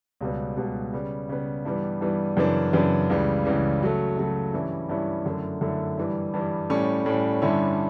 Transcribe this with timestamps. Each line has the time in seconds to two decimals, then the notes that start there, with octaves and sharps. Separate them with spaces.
0.21 C#2 B2 G3 B3
0.57 C#2 B2 G3 B3
0.93 C#3 G3 B3
1.29 C#3 G3 B3
1.65 G2 E3 G3 B3
2.01 G2 E3 G3 B3
2.37 F#2 C#3 E3 B3 D4
2.73 F#2 C#3 E3 B3 D4
3.09 C#2 C#3 E3 G3
3.45 C#2 C#3 E3 G3
3.81 C#3 F#3 A3
4.17 C#3 F#3 A3
4.53 G2 E3 G3 C#4 E4
4.89 G2 E3 G3 C#4 E4
5.26 F#2 D3 A3 E4
5.61 F#2 D3 A3 E4
5.97 G2 E3 G3
6.34 G2 E3 G3
6.70 A2 G3 C#4
7.06 A2 G3 C#4
7.42 G2 D3 G3 C#4 E4